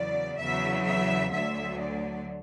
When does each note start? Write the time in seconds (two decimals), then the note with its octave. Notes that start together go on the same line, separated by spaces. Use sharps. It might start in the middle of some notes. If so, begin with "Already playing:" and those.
Already playing: E2 C#3 F#3 D5
0.38 E2 C#3 F#3 E5
0.86 E5
1.33 D2 D3 F#3 E5
1.80 D5